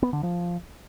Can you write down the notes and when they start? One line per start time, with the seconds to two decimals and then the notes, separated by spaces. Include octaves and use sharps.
0.03 B3
0.13 D3
0.23 F3